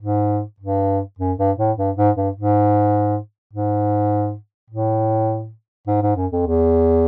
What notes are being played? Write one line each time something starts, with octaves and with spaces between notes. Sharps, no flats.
G#2
G2
F#2
G2
A2
G2
G#2
G2
G#2
G#2
A2
G#2
G#2
F#2
F2
E2